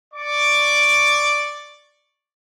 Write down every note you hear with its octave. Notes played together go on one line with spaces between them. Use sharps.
D5 C#6 D6